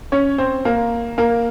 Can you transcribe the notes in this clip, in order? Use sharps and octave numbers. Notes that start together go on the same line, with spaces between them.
C#4 C#5
C4 C5
A#3 A#4
A#3 A#4